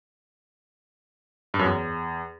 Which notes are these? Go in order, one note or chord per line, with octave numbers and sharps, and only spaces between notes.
G2
F#2
E2